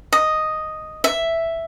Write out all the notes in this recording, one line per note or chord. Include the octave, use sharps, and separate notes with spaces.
D#5
E5